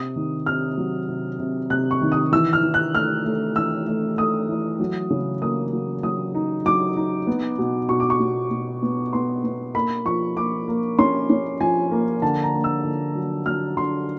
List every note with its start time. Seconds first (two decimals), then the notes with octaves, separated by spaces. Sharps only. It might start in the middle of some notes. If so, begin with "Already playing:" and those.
Already playing: C3 D#6
0.16 D#3
0.46 C3 F6
0.77 F#3
1.09 C3
1.40 C3
1.70 C3 F#6
1.91 C#6
2.02 D#3
2.12 D#6
2.32 E3 E6
2.53 F6
2.63 E3
2.74 F#6
2.94 A3 F6
3.25 A3
3.56 E3 E6
3.87 A3
4.18 A3 D#6
4.49 E3
4.80 F#3
5.10 C#3
5.42 A#3 D#6
5.73 F#3
6.03 F#3 D#6
6.35 D#4
6.66 F#3 D6
6.96 D#4
7.27 B3
7.58 B2
7.89 B2 C#6
8.00 D6
8.10 C#6
8.20 B2
8.51 B2
8.82 B3
9.13 B3 C6
9.44 B3
9.75 A#3 B5
10.06 F3 C#6
10.37 A#3 D6
10.68 A#3
10.99 C#4 C6
11.30 C#4
11.61 F3 G#5
11.92 A#3
12.22 D3 A5
12.43 A#5
12.53 A#3
12.64 E6
12.84 D3
13.15 F#3
13.46 F#3 F6
13.77 D3 C6